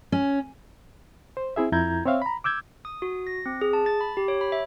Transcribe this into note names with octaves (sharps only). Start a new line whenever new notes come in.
C#4
C5
C4 E4 G#4 E5
F2 E4 A#5 G6 G#6
C4 C#5 E5 F5
A#5 B5
D6 E6 G6 G#6
D#6
F#4
A#6
C4
G#4
A5
A6
B5
G4
C#5
B5
E5